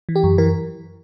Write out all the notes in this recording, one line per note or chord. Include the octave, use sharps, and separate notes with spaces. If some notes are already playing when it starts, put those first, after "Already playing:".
E3
G4
F#2
E3 A#4